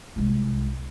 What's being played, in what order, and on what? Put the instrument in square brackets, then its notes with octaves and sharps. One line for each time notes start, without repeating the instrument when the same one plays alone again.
[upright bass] C2 G#3